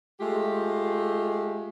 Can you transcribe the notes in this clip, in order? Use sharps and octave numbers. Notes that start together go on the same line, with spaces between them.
G#3 A3 F4 G4